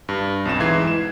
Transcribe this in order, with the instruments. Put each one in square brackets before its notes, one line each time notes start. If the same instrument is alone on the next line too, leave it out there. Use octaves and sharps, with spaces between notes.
[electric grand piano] G2
B1 F2 E7
G#2 E3 E5 G#6 C7
E7